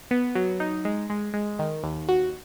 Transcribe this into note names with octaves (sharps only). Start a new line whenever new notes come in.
B3
F#3
D#4
G#3
G#3
G#3
D#3
D#2
F#4